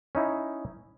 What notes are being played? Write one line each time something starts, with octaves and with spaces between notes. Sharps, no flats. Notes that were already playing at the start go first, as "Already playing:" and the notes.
C#4 D#4 E4